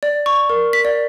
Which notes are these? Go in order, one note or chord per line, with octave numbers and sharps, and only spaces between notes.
D5
C#6
A#4
B6
D5